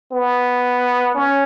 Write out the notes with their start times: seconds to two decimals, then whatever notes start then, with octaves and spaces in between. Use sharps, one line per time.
0.12 B3
1.15 C#4